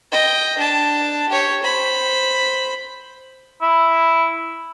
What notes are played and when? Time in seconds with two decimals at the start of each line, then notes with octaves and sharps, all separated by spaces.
0.12 D#5 G5
0.58 D4 A5
1.28 G4 C#5
1.62 C5 B5
3.62 E4